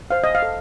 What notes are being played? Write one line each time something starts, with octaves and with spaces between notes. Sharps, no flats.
C5 F5
D#5
F5
A4